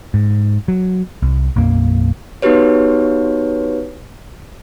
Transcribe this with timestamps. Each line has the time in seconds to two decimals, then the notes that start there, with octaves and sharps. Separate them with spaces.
0.14 G#2
0.68 F#3
1.22 C2
1.56 B1 F#2 A#3
2.42 B3 D#4 F#4 G4 B4 C#5